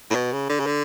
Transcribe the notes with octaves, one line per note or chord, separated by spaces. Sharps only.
A2
B2
C#3
D3
C#3
D3